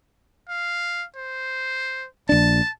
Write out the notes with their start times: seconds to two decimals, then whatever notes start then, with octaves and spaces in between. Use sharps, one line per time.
0.49 F5
1.16 C5
2.29 A#1 D4 A5